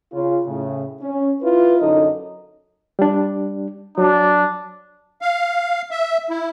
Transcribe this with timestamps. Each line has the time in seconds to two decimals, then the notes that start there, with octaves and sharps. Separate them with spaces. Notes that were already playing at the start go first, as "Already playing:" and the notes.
0.13 C#3 F4
0.45 A2 C#3
1.01 C#4
1.41 E4 F4 B4
1.79 F#2 D3 D#4 A4 D#5
2.99 G3 D4
3.98 F#3 D4
5.21 F5
5.91 E5
6.30 E4